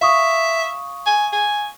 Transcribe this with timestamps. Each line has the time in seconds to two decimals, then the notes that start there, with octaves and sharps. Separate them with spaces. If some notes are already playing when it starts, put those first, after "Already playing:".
0.01 E5 F5 C#6 D#6
1.06 G#5
1.33 G#5